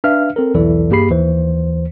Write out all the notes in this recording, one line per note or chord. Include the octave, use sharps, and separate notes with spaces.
D4 B4 E5 F5 F6
C4 A4 A#4
B1 E2 E3 E4 A4 D5
G2 A#3 G4 G#4 B5 C7
D#2 E3 C5